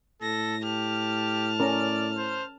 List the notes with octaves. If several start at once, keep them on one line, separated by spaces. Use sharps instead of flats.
A2 A4 A#6
G4 A5 F6
C#4 A#4 D5
C5